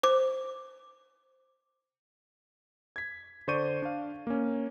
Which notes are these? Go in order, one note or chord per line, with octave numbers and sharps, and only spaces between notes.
C5 D6
G#6 B6
D3 C5 D5 C#6 G6 D#7
D4 F5
A#3 C#4